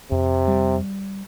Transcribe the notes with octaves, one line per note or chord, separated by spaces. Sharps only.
F2 C3
G3